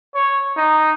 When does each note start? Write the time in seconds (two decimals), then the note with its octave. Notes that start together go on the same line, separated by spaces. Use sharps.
0.15 C#5
0.57 D#4